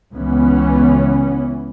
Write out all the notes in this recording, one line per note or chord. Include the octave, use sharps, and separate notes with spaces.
C#2 E3 B3 C#4